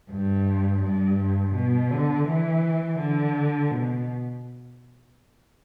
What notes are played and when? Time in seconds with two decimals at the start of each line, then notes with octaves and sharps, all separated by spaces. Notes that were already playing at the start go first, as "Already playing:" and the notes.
0.11 G2
0.83 G2
1.55 B2
1.91 D3
2.27 E3
2.99 D3
3.71 B2